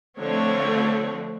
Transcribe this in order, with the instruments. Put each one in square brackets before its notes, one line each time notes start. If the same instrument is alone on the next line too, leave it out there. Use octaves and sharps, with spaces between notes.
[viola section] D3 F3 A3 C4 C#5